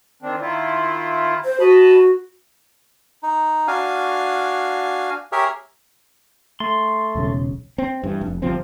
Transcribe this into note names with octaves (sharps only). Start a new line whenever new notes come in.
D#3 C4 D4
D#3 E4 F4
C5
F#4 D#5 A5 B5
D#4
D4 F#4 F5 G#5
G4 G#4 A#4 C#5 E5
A3 C6
E1 B1 C#3
C4
G2 E3
F1
G1 C3 F3 C4